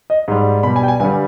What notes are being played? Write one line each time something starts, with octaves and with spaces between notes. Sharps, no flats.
D#5
G#2 G3
B2 G3 B5
G#5
G5
G#5
G2 D3 G3 G#5